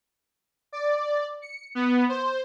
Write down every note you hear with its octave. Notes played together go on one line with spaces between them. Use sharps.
D5
C#7
B3
C5